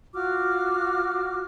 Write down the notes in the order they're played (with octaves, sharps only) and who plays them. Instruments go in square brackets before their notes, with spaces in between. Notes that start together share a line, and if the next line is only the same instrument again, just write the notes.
[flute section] F4 F#4 D6 F6